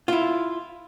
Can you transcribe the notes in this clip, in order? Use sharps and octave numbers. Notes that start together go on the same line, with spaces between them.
E4 F4